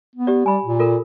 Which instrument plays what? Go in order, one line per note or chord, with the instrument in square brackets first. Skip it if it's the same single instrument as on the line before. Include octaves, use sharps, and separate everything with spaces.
[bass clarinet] B3
[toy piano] G4 D5
[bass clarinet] G3 [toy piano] G#5 B5
[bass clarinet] A#2
[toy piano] F4 A4 A#4